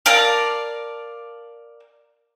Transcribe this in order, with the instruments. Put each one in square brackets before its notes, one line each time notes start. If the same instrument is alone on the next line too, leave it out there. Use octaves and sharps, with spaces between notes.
[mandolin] A#4 D5 F5 A5